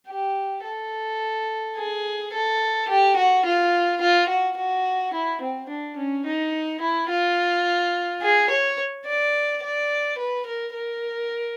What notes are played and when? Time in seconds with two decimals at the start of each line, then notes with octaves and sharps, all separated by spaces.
0.09 G4
0.64 A4
1.77 G#4
2.33 A4
2.88 G4
3.16 F#4
3.45 F4
4.01 F4
4.29 F#4
4.57 F#4
5.14 E4
5.41 C4
5.69 D4
5.97 C#4
6.26 D#4
6.81 E4
7.09 F4
8.22 G#4
8.50 C#5
9.06 D5
9.63 D5
10.19 B4
10.46 A#4
10.74 A#4